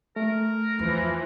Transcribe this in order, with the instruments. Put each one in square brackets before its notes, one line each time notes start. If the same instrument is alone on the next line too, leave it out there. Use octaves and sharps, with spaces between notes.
[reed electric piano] A3 [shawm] A#4
[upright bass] E2 [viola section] E3 F3